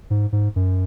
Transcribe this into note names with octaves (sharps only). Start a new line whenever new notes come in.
G#2
G#2
F#2